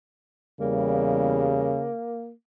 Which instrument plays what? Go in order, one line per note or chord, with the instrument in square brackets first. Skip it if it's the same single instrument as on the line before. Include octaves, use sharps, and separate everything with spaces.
[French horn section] E2 G3 [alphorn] C#3 [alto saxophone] A#3